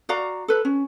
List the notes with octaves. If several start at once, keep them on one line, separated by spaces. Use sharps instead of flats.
F#4 D5 F5 A#5
A4 B4
C#4